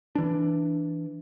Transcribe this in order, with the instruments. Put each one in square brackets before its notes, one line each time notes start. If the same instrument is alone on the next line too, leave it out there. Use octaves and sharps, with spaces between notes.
[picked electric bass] E3 D4